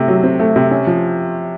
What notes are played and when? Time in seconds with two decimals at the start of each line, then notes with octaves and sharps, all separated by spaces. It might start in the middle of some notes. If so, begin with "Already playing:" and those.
Already playing: C3 A3
0.08 F#3
0.23 C4
0.40 A3
0.56 C3
0.71 C#4
0.87 F3